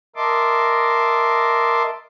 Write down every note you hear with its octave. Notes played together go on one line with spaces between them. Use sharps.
A#4 D#5 E5 A5 C6 D6